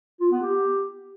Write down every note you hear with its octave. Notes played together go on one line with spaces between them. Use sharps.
F4
B3
G4